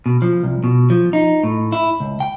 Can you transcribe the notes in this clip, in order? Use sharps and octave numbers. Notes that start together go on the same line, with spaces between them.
B2
F3
C2
B2
F3
D#4
A2
E4
C#2
G5